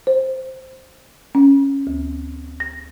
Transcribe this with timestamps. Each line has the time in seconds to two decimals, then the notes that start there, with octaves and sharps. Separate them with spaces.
0.07 C5
1.35 C#4
1.87 D2
2.60 A#6